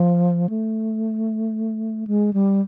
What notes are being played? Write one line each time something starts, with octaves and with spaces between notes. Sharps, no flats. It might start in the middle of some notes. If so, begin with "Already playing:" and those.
Already playing: F3
A3
G#3
G3